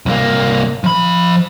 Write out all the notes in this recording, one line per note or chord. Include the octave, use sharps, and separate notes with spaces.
C2 A#3
F3 B5